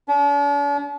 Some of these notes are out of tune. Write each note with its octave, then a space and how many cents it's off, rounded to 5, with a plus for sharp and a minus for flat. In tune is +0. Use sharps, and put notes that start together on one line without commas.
D4 -45